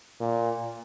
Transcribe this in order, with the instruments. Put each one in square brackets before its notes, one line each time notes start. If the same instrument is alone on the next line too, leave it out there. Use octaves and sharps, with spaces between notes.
[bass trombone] A#2